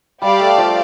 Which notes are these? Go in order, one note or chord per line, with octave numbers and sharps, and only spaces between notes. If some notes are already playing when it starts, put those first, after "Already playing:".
G3 G4 D5 F5 A5
A3
F3